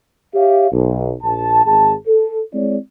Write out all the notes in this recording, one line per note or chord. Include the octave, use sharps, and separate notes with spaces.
G4 C#5 E5 F5
B1
A#1 A5
G#1 G#4 A5
A4
G#3 C4 E4 C#5 D5